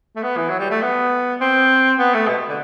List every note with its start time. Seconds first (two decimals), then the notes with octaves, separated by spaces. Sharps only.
0.16 A3
0.23 B3
0.37 E3
0.49 F#3
0.59 G3
0.70 A3
0.82 B3
1.41 C4
1.98 B3
2.14 A3
2.28 B2
2.48 D3